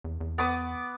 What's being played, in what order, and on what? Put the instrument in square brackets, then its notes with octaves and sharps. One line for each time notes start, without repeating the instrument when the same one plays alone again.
[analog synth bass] E2
E2
[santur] B3 D6 D#6